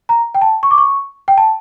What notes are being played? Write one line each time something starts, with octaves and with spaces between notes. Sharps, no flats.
A#5
G5
A5
C#6
D6
C#6
G5
A5